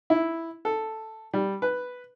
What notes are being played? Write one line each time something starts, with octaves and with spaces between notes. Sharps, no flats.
E4
A4
G3
B4